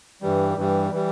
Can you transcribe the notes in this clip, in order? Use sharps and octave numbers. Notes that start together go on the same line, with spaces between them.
G2 E3 G3
G2 E3 G3
E3 G3